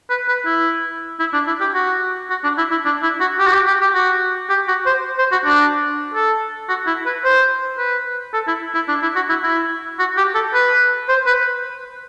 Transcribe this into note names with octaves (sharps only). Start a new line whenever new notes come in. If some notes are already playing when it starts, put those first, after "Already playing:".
B4
B4
E4
E4
D4
E4
G4
F#4
F#4
D4
E4
E4
D4
E4
F#4
G4
F#4
G4
G4
G4
F#4
G4
F#4
C5
C5
F#4
D4
A4
F#4
E4
B4
C5
B4
A4
E4
E4
D4
E4
F#4
E4
E4
F#4
G4
A4
B4
C5
B4